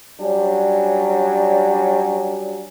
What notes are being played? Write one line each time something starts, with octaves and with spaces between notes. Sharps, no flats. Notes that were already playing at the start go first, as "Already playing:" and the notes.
F#3 G3 C#4 D4